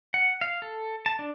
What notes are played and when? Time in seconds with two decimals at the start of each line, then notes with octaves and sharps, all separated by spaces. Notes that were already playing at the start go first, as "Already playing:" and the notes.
0.14 F#5
0.41 F5
0.62 A4
1.06 A5
1.19 D4